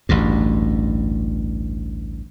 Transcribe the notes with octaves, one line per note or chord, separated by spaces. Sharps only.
A1 D2 G2